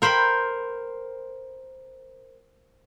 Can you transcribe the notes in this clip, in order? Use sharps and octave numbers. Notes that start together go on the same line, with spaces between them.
A#4 C5 G5 B5 C6